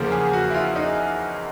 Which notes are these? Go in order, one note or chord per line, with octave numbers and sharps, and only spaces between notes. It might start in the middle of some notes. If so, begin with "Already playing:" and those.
Already playing: E2 C#3 F3 A#3
G#4
F#4
E4
F4
D#4